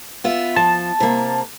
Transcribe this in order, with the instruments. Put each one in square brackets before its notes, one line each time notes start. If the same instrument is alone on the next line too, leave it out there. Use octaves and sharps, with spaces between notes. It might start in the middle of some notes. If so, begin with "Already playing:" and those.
[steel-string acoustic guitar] B3 F4 E5
[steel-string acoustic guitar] F3 [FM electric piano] A5
[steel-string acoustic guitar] C3 A#3